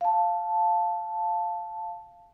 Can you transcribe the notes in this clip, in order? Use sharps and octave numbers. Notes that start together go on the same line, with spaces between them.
F5 A5